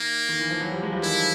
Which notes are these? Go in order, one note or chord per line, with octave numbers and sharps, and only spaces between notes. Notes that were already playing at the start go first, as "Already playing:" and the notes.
Already playing: D#3 A#3
D#3
E3
F3
E3 F#3
F3 G3
F#3 G#3
F3 G3
D#3 F3 E4